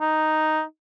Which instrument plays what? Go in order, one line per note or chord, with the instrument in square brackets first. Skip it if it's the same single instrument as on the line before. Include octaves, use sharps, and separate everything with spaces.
[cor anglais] D#4